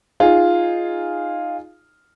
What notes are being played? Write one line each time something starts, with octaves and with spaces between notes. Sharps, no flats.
D#4 F4 G#4